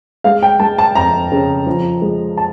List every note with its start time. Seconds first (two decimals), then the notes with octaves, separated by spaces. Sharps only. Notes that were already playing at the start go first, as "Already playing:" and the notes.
0.24 G#3 F5
0.43 G5
0.59 G#3 A5
0.78 A5
0.95 F2 A#5
1.32 C#3
1.67 F3
2.02 G#3
2.37 A5